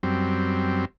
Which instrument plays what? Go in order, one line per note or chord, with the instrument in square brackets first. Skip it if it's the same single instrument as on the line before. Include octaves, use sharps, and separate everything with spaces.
[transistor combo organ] F#2 G3 C4